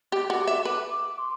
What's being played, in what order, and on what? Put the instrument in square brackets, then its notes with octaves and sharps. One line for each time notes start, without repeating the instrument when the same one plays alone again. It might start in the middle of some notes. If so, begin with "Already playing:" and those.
[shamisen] G4 [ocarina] D6
[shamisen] F#4 [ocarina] D6
[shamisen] E5 [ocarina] D6
[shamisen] B4 [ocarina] D6
[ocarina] D6
C6